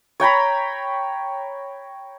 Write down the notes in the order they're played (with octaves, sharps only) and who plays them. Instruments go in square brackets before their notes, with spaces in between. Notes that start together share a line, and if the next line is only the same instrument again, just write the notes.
[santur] C#5 G5 A#5 B5